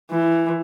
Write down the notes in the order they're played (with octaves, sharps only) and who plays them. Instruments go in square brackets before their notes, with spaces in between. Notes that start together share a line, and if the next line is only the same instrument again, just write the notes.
[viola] E3